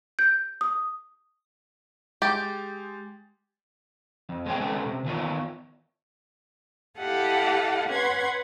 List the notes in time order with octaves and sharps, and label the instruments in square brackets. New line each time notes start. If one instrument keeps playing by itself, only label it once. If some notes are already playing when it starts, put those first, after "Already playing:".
[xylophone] G6
D#6
[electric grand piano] G#3 G6 A6 [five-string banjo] G4
[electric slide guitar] F2
G#3 B3 C4 G#4 C#5 G5
G#3 C#4 A4 B4 C#5
C3
D#3 E3 A#3 B3 F4 C#5
[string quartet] E4 G4 A4 D#5 F5 F#5
C#4 B4 F#5 C6 G#6